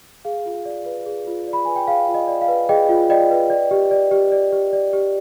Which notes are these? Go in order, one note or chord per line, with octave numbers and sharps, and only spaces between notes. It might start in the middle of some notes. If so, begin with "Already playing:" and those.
G#4 F5
F4
D5
B4
G#4
F4
D5
B5
B4 G#5
G5
G#4 F5
F4
D#5
D5
F5
B4
G#4 D#5 G5
F4
D5 D#5 G5
B4
D5
G4
D5
G4
D5
G4
D5
G4